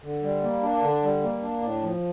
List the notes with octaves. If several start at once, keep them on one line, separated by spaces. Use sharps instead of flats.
D3
G3
A#3
D4
D3
G3
A#3
D4
A2
F3